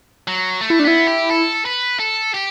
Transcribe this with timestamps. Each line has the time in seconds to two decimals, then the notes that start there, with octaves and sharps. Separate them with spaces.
0.27 F#3
0.61 A3
0.70 E4
0.79 D4
0.84 B3 E4
1.07 G4
1.31 A4
1.65 B4
1.99 A4
2.34 G4